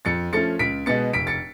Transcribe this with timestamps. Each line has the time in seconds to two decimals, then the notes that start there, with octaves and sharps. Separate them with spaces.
0.05 F2 A6 C#7
0.33 F3 A3 C#4 A6 C#7
0.59 C#2 B6 D7
0.86 B2 G#3 B3 A6 C#7
1.13 F1 B6 D7
1.27 A6 C#7